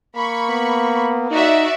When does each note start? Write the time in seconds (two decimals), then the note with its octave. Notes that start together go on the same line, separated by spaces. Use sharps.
0.16 A#3 B5 C#6
0.50 B3
1.31 D#4 F#4 D5 E5